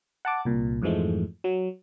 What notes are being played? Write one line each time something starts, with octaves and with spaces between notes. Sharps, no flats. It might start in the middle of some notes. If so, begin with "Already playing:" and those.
F#5 A5 D6
C2 A#2
F2 G#2 E3 F3 G#3 A3
F#3